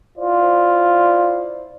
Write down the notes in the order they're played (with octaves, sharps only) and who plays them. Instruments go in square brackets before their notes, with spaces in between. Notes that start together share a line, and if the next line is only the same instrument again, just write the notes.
[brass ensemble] E4 C5 D5 [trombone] F4